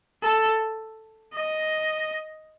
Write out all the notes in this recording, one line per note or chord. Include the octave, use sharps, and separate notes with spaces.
A4
D#5